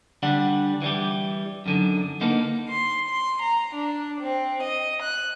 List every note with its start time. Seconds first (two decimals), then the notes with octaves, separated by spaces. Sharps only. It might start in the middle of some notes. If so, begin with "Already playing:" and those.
0.23 D3 G3 D4 F#5
0.82 E3 G3 G4
1.66 F#2 D3 D#3
2.21 D3 A#3 B3 D#4
2.71 C6
3.09 C6
3.44 A#5
3.76 D4
4.21 C4
4.64 D#5
5.03 F#6